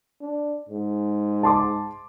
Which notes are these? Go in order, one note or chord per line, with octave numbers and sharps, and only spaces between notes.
D4
G#2
A5 C6 D6